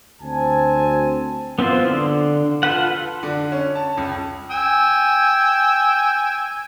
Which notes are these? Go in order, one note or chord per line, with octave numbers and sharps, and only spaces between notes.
D2 C4 G#5 A5
B3 C4 E4 F4 C5
D3
F4 A4 B4 F#5
D3
C#4
A5
C#2
G5 G#5 E6